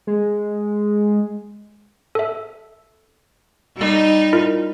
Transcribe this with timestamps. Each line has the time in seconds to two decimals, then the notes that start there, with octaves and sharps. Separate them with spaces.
0.07 G#3
2.15 A4 E5
3.77 G3 D#4
4.33 E4 F4 A#4